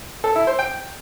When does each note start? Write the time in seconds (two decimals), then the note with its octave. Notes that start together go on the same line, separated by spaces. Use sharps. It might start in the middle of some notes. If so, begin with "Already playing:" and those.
0.24 A4
0.35 E4
0.47 C5
0.59 G5